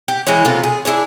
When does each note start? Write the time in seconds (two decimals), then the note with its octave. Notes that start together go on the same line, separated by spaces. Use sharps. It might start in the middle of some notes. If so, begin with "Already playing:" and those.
0.08 G4
0.27 E3 G#3 E4 C#5
0.45 C3 A3 B3 F4
0.64 G#4
0.85 D4 E4 G#4 C#5